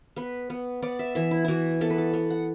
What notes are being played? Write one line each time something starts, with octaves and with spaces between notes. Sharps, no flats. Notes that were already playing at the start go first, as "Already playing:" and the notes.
B3 B4
B3
B3 D5
E5
E3 E5
E4
E3 E4 F#4
B3 A4
B4
A4
B3
F#5